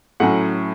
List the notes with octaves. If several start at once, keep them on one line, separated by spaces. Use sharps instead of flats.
A2 F#3 C#4 F#5